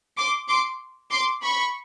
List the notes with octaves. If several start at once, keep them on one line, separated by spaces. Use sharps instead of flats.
C6 D6
C6 D6
C6 D6
B5 C#6